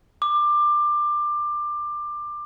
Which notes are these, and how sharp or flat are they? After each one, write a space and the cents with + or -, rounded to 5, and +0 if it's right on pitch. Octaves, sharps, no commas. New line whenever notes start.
D6 +20